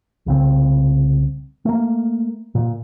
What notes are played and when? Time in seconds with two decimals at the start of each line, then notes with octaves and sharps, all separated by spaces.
0.26 C2 C#3 C4
1.65 A3 A#3
2.55 A#2